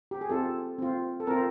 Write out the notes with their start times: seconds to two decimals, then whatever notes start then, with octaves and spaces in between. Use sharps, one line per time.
0.11 G4
0.21 G#4
0.29 C4 F4 A4
0.79 C4 F4
1.20 A4
1.27 C4 F4 A#4